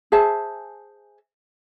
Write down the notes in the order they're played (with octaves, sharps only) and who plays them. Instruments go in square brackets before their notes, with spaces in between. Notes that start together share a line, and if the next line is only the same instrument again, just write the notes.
[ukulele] G#4 C5 E5 A5